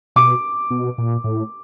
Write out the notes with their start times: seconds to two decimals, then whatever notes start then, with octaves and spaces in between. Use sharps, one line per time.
0.16 B2 D6
0.71 B2
0.98 A#2
1.24 A2